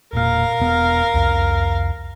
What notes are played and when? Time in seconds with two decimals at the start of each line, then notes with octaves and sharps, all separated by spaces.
0.13 E1 A#2 A#4 F5
0.60 E1 B3
1.14 C2 F2